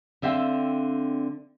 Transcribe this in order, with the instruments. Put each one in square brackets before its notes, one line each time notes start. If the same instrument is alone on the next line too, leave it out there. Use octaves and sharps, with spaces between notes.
[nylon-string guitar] D3 C4 E5 F5 G5